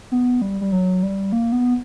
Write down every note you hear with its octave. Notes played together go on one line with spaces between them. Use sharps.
B3
G3
G3
F#3
G3
A#3
B3